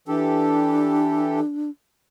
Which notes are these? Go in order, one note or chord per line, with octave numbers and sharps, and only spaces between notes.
E3 D4 G4 A4